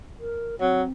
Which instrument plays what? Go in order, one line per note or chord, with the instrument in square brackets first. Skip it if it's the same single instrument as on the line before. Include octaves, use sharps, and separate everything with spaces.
[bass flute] A#4
[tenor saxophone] F#3 [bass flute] C4